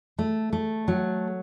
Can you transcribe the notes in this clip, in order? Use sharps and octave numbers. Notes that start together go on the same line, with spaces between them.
A3
A3
F#3